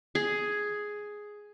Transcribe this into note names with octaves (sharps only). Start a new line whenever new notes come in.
G#4